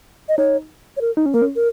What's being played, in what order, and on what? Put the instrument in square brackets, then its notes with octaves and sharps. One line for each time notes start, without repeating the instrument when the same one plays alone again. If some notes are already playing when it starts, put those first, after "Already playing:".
[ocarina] D#5
[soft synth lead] D#4 [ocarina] C#5
[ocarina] C#5
A#4
[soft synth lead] D#4
C#4
[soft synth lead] A#3 [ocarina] A#4
[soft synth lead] C#4
[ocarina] A#4